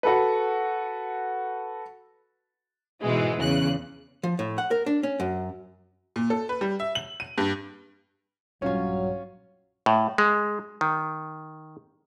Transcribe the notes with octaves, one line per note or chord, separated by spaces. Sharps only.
F#4 A4 B4
G#2 B2 E3 G#3
E2 C#3 F#6
F3
A2
F#5
A#4
D4
C#4
F#2
A#2
A4
B4
G3
E5
F#7
D#7
G2
A#1 G2 F#3 C#4 F4 C#5
A2
G#3
D#3